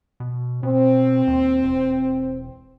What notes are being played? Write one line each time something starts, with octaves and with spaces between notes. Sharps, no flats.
B2
B2 C4
D#2
E1